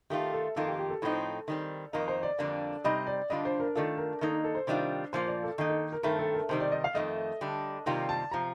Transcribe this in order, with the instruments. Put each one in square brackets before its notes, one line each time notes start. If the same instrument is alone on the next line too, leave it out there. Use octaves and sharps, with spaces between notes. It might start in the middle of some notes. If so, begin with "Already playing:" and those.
[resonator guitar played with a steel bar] D#3 A3 D4 F4 [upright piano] G4
[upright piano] A4
[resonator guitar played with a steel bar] F2 D#3 A#3 F4 [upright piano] A4
[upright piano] G4
G4
A4
[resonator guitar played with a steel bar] A2 F3 C4 D#4
D#3 G3 C4
[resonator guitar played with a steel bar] F2 D#3 A#3 D#4 [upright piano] A#4
[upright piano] C5
D5
[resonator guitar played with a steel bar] F2 D3 G3 A#3 D4
[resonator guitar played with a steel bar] C3 G3 C4 D#4 [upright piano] D#5
[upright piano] D5
[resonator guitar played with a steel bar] D3 G3 D4 F4 [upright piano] D#5
[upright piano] C5
A#4
[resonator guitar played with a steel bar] D#3 A3 D4 F4 [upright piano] A4
[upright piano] A#4
[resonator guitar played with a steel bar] D#3 A#3 D#4 [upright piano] A4
[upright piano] A4
C5
[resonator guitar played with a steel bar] C3 D#3 G3 D4 F4
[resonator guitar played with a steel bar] A#2 F3 A#3 F4 [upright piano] C5
[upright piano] D5
A4
[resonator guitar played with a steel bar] D#3 A#3 D#4 [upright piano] A4
[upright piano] A4
A#4
[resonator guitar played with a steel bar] G2 D#3 A3 C4 [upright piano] A#4
[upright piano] A4
A#4
[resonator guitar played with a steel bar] C3 D#3 G3 [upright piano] C5
[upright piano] D5
D#5
F5
[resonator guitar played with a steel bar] F2 D#3 A3 [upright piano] D#5
[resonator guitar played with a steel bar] D3 G3 D4
[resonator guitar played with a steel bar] C3 D#3 G3 A#3 F4 [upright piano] G5
[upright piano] A5
[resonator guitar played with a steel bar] C3 F3 [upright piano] A#5